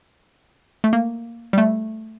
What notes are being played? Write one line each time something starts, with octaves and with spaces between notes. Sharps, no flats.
A3
A#3
G3
A3